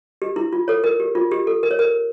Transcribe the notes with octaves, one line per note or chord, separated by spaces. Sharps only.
G4
E4
F4
A4 C#5
A#4
G4
F4
G4
A4
A#4
C#5
A#4